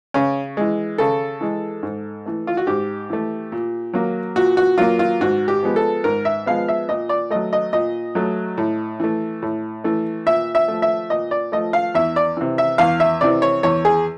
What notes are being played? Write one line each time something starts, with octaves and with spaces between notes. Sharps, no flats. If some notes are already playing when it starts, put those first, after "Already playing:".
C#3 C#4
E3 G#3
C#3 A4
E3 G#3
G#2
E3 A3
F4
F#4
G#2 G4
E3 A3
A#2
F#3 A#3
A#2 F#4
F#4
F#3 A#3 F4
F4
G#2 F#4
G4
F3 G#3 B3
A4
G#2 A#4
E5
F3 G#3 B3 F5
E5
A#2 D#5
D5
F#3 A3 D#5
D#5
A#2 D#5
F#3 A3
A2
E3 A3
A2
E3 A3
A#2 E5
E5
F3 A3
E5
A#2 D#5
D5
F3 A3 D#5
F5
E2 E5
D5
C3 E3
E5
E2 F5
E5
C3 E3 D5
C#5
E2 C#5
G#4